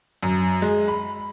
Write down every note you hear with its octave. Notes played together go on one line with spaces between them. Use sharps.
F#2
G#3
B5